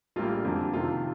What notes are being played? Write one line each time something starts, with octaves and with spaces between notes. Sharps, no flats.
A#1 A2 G3 A#3 F4
F2 D3 G3 A#3
F2 C3 D#3 F4